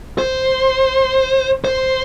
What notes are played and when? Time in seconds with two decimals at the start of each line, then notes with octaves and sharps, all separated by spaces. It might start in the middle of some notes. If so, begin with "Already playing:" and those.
0.18 C5
1.65 C5